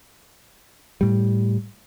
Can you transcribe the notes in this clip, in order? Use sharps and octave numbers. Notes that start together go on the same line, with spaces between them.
A2 G3